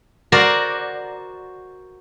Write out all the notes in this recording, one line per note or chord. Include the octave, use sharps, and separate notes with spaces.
F#4 A#4 C5 D5